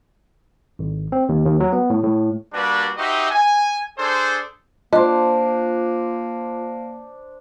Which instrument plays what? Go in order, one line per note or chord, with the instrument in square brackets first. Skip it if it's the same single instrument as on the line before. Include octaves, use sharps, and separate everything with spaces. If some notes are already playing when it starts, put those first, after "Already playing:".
[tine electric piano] G#1
C4
D#2
D#2
F#3
B3
A2
A2
[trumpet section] G3 A#3 D4 F#4 B4 D5
D#4 F#4 G4 C5 D#5 E5
G#5
D4 G#4 A4 C5
[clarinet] A#3 [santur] D4 C5 [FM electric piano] F4 [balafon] D#5